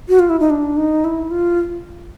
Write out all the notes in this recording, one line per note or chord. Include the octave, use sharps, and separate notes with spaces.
F#4
F4
E4
D#4
D4
D#4
E4
F4